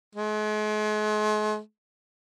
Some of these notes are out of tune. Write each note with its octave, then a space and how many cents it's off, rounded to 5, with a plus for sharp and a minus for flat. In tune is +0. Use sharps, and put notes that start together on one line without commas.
G#3 +40